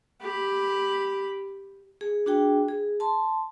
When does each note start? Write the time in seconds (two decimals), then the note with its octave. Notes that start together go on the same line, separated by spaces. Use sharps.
0.21 G4 B5
2.01 G#4
2.26 D4 F#4 G#4 G5
2.68 G#4
3.00 A5 C6